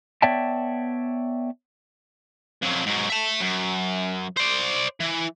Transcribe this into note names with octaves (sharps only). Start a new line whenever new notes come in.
B3 C#5 D5 E5 G5 A5
F2 F#3
G#2 F#3
E5 A5
F#2
C5 D5
E3